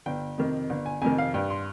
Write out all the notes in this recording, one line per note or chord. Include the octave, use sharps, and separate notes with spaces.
G1 G5
F2 C3 D#3
G1
G#5
F2 C3 D#3 G#5
F5
G2 G5
C6